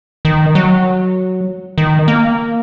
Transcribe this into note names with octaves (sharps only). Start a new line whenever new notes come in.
D#3
F#3
D#3
A#3